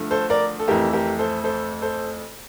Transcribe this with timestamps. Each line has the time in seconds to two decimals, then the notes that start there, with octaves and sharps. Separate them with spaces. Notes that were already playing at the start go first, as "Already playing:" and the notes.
Already playing: G2 D3 F3 A3
0.11 A4 C5
0.30 A#4 D5
0.59 A4
0.68 F2 E3 A3 G4 A#4
0.93 G4 A#4
1.19 A4 C5
1.44 A4 C5
1.82 A4 C5